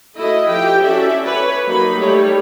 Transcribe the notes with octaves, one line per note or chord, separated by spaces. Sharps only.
A3 E4 F#4 D#5
F3 G4 G5
C#4 F#4 A4 D5 E5
B4 C#5
F#3 A#3 D#4 B5
G3 A3 C#5